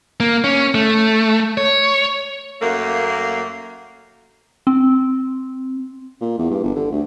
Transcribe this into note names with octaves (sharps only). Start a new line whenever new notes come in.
A#3
C#4
A3
C#5
F#2 A3 A#3
C4
A#2
E2
G2
G1
D3
D2